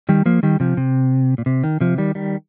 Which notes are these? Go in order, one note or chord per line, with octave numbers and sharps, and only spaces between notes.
D#3 G3
F3 A#3
D#3 G3
C3 F3
C3
A#2
C3
D#3
C3 F3
D#3 G3
D#3 G3